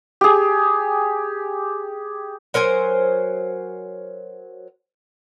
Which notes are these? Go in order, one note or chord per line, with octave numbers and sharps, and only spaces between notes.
G4 G#4
F#3 A#4 C5 G#5